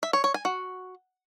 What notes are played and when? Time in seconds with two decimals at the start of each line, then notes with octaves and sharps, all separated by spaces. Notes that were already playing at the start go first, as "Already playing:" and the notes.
0.03 E5
0.13 C#5
0.24 C#5
0.34 G#5
0.45 F#4